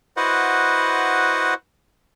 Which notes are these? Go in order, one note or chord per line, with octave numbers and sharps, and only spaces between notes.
E4 F#4 B4 C5 D#5 F#5